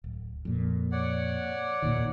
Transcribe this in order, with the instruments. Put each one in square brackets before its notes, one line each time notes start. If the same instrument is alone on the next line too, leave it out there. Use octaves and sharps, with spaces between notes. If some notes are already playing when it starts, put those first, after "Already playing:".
[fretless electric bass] D1
F2 A#2
[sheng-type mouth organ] C#5 D5 F#5
[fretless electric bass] D#2 A#2 D#3